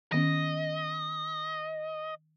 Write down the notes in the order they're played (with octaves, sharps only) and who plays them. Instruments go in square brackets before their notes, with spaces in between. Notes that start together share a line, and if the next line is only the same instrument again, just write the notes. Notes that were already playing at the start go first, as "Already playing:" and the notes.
[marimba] D#3 B3 C#4 [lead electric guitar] D#5